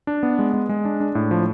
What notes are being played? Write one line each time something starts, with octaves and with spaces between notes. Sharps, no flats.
D4
B3
G#3
G#3
G#3
D4
D4
A2
F3